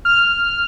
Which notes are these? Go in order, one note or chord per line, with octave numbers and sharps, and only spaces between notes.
F6